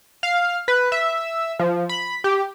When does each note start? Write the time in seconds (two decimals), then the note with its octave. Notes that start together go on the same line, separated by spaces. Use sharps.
0.23 F5
0.68 B4
0.92 E5
1.59 F3
1.89 B5
2.24 G4